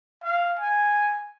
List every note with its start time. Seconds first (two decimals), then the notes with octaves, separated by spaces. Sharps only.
0.23 F5
0.59 G#5